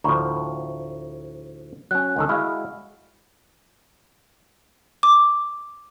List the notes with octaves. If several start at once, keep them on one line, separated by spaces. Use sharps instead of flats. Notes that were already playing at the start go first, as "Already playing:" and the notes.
D2 A2 F3 A#5 B5 C#6
F#3 C#4 G#5 F#6
C#2 D#3 A4
G#3 E4 F#4 F5 F6
D6